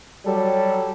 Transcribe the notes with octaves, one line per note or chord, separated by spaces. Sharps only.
F#3 G3 A4